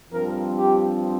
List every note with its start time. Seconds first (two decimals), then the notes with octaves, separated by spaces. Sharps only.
0.12 G2 F3 C4 A#4
0.58 G4